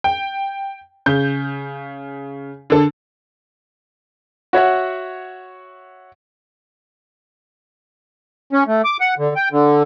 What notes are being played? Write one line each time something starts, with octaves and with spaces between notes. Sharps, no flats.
G5
C#3 G6
D3 A4
F#4 C#5 E5 F#5
C#4
A3
D6
F#5
D3
G5
D3